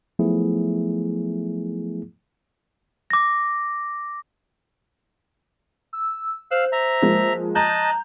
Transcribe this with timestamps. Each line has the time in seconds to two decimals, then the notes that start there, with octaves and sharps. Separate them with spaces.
0.19 F3 F#3 A3 B3 E4 G#4
3.10 D6 A#6
5.93 E6
6.51 C5 F5 E6 F#6
6.72 E5 A#5
7.02 F3 G#3 A#3
7.55 D#5 A5 A#5 F#6 G6